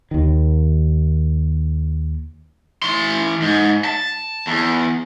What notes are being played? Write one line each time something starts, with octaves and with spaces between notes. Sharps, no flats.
D#2 D#3
E3 C6
G#2
A5
E2